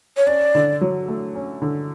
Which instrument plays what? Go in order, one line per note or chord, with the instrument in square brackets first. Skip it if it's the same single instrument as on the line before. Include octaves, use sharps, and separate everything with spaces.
[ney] C#5
[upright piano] C#4 [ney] D5
[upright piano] D3
F#3
A3
C#4
D3